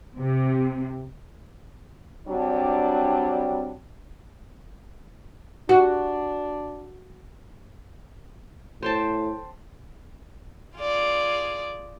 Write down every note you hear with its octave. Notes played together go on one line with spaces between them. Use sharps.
C3
F#3 G3 C4 D4
D4 F#4
A2 C5 G5 A5
F4 G#4 D5